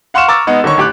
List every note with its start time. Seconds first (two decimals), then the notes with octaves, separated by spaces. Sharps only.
0.14 F5 F#5 C6 C#6 F6 E7
0.28 A#5 C#6 D6 E6 F6 A6
0.47 G#3 B3 D#4
0.64 D3 D#3 C#5 C#6
0.77 A1 G4 D6 F#6